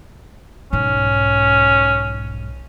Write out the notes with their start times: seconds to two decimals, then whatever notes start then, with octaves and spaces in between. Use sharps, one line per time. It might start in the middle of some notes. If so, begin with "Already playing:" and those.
0.73 B1 G#2 C#4